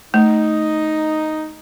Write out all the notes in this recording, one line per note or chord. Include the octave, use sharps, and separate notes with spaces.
A3 D#4